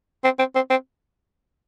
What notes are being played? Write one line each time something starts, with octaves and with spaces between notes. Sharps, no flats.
C4
C4
C4
C4